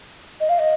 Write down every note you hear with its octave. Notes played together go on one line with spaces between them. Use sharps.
D#5
F5
D#5